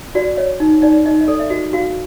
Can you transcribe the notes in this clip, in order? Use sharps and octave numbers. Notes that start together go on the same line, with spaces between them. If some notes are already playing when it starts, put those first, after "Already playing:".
F#4 D5
C#5 D#5
D#4
D#4 D5
D#4 D#5
D#5
A4 D5
E5
F#4 D#5
F#4 F5